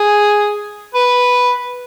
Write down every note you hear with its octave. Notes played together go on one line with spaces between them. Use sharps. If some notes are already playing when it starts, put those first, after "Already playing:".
Already playing: G#4
B4